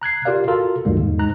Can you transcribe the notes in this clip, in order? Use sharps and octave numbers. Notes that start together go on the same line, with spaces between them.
A#5 F#6 G#6 C7
F4 G4 A#4 D5 F5
F4 F#4 A4 A#4
D2 G2 D#3 G3 A#3
E2 G#2
G#2 A#5 F#6